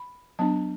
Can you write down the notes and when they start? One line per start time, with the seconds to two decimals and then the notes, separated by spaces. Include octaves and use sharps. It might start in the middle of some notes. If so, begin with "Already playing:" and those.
Already playing: B5
0.39 F#3 B3 D4 A5